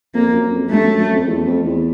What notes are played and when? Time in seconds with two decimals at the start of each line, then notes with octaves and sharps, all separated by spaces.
0.14 F2 A#3
0.33 F#2
0.52 F2
0.70 G2 A3
0.84 F#2
0.99 F#2
1.13 F2
1.27 E2
1.46 F2
1.65 E2